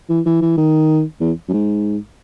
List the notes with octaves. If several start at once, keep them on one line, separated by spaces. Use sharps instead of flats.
E3
E3
E3
D#3
E2
F#2
G#2